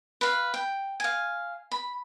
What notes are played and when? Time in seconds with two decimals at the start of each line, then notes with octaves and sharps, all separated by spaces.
0.21 B4 F5
0.54 G5
1.00 F5 G#5
1.71 B5